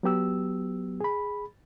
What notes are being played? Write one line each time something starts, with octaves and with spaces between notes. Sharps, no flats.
F#3 B3 G4 E6
G#4 B5